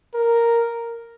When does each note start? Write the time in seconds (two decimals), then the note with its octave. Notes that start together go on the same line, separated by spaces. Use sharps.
0.14 A#4